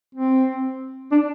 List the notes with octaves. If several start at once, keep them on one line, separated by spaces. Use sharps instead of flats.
C4
D4